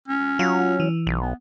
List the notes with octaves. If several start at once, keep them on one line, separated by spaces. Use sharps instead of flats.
C#4
F#3 F4
E3
B1
B3